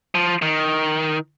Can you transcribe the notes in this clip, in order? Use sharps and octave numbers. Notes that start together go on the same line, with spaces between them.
F3
D#3